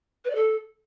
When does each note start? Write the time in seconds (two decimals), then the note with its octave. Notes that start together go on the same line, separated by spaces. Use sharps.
0.25 B4
0.30 D5
0.35 A4